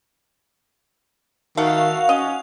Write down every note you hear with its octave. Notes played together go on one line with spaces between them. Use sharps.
D#3 A3 F#4 F5 F#5
C#4 D#5